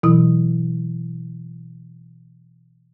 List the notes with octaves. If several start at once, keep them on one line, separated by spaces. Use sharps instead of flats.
B2 E3 F#3 E4 D#6